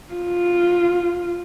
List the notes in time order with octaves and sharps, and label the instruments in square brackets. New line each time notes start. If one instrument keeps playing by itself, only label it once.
[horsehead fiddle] F4